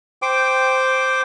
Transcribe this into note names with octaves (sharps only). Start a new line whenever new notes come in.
C5 G5 D6